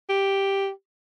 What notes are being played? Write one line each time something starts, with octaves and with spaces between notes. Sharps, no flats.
G4